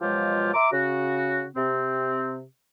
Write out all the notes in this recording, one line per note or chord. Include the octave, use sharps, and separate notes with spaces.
B2 F3 F#3 G#3 F4 G4
E5 A#5 C6 D6
C#3 F#4
C3 C4